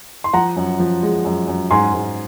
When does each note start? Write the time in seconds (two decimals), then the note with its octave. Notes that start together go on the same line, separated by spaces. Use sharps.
0.24 C6
0.33 F3 F#5 A#5
0.56 F#2
0.79 F3
1.03 G#3
1.25 F#2
1.48 F#2
1.71 G#2 G#5 C6
1.94 G#2